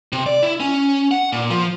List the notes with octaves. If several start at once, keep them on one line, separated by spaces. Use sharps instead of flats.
C3
D5
E4
C#4
F#5
A#2
F3